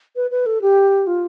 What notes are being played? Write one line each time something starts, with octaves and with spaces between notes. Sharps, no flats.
B4
B4
A4
G4
F4